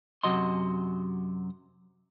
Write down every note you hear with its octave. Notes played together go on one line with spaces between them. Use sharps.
F#2 C3 F#3 F#4 D#5 C6